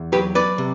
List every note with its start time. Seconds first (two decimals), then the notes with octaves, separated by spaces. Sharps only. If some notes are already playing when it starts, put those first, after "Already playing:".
Already playing: E2
0.12 F#3 G4 B4
0.35 B4 D5
0.58 C3